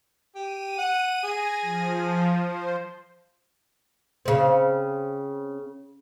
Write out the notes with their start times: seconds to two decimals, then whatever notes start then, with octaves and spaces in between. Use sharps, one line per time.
0.36 G4 D#7
0.78 F#5
1.23 G#4 G#6 A#6
1.62 F3
2.39 C5
4.26 C#3 C4